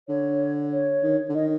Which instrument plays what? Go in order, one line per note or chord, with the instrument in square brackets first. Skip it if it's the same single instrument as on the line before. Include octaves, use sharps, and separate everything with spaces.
[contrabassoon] D3 [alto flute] C#5
[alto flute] C#5
[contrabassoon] D#3
D3
[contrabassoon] D#3 [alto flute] D#5